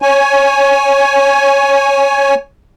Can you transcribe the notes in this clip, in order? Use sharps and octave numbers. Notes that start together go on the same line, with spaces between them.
C#5 G#5